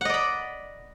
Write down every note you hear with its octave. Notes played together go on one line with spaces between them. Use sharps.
D5 D#5 F#5 B5